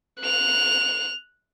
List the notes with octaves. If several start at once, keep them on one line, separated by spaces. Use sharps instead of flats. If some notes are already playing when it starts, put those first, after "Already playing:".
F#6 F7